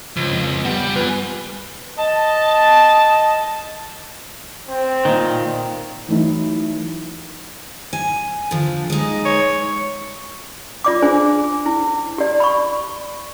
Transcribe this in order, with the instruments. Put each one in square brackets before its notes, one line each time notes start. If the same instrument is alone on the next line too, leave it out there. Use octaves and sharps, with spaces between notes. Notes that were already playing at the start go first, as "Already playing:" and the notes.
[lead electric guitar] C#2 [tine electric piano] F3
[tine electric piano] F2
[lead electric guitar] G3 G4 [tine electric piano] B3
[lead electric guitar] F4 G#5 [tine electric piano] B4
[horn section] D#5 A5
[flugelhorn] C4
[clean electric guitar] A#2 D#3
[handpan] E3 F#3 A3 D#4 E4
[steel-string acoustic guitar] G#5
D3 F3
G#3 D#4
[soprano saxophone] C#5
[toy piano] F4 D5 D6
D4 G#4 C5 G#5
E4
G4 D5
B5 C#6